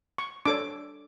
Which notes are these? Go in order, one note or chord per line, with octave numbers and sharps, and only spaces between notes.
C#6
D4 A4 C#5 D6